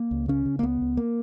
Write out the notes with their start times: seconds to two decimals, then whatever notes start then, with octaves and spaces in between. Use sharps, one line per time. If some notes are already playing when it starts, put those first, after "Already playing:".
Already playing: A#3
0.11 C#2
0.28 C#3 C#4
0.46 C#3
0.59 A#3
0.63 C#2 B3
0.81 C#2
0.97 A#3